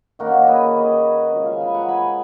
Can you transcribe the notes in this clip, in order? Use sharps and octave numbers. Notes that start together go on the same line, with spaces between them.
D#3 A#3 C#4 F#4 A#4
G#4 B4
B4 D#5
C#3 F3 G#3
F5 G#5
G#5 B5
F#5 A#5
G#5 B5